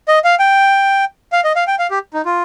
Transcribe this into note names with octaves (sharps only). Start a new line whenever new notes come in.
D#5
F5
G5
F5
D#5
F5
G5
F5
G4
D#4
F4